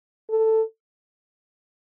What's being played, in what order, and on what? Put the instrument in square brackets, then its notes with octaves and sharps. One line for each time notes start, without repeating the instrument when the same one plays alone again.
[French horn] A4